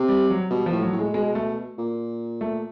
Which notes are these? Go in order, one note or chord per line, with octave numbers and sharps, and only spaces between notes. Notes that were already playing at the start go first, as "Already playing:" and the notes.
Already playing: C3
G3
F#3
B2 G3
F3
A2
F#3
A2
G#3
B2 G#3
A3
A#2
A3